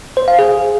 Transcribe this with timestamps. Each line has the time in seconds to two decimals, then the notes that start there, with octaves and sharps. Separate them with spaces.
0.17 C5
0.28 F5
0.39 G#4